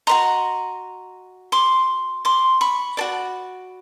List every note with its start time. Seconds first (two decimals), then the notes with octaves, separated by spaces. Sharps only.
0.07 F#4 B4 D#5 A#5 C6
1.52 C6 D6
2.25 C6 D6
2.61 B5 C#6
2.97 F#4 A4 D5